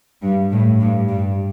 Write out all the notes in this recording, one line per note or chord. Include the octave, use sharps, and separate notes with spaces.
G2
A2
G2
G2